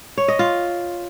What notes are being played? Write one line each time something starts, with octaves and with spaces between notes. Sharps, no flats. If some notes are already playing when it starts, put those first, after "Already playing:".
C#5
D#5
F4